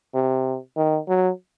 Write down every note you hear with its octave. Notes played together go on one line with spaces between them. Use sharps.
C3
D#3
F#3